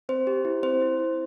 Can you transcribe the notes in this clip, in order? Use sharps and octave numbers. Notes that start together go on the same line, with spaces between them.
C4 C5
G4
E4
C4 C5
E4
E4